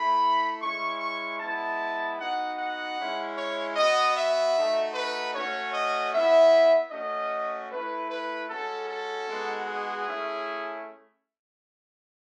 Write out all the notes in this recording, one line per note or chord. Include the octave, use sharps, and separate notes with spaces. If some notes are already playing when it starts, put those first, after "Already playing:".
Already playing: A3 E4 B5
G#3 C#4 E4 C#6
C#6
G#3 B3 E4 A5
B3 D#4 F#4 F#5
F#5
G#3 C#4 E4
C#5
B3 F#4 D#5
E5
A3 D#4 F#4
B4
A3 C#4 F#4 C#5
D#5
B3 E4 E5
A3 C#4 F#4 D#5
A3 E4 B4
B4
G#3 C#4 F#4 A4
A4
G#3 B3 D#4 F#4
G#4
A3 C#4 E4